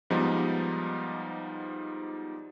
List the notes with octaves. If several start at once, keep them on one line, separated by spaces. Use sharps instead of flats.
G#2 F3 G3 B3 D#4